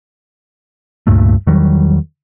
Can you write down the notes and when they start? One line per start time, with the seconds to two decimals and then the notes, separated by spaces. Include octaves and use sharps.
1.07 C#2 G2 A#2 A3
1.47 E2 D#3 F#3 G3